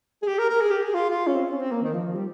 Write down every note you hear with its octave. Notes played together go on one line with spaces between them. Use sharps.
G#4
G4
A#4
A#4
G#4
G4
G#4
F4
F4
C#4
C4
C#4
C4
A#3
D#3
F3
F3
G3